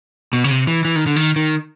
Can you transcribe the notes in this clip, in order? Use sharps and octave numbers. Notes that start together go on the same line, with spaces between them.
B2
C#3
C3
E3
E3
D#3
D3
D#3
D#3